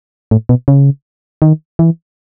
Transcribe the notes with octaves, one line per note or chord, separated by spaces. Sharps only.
A2
B2
C#3
D#3
E3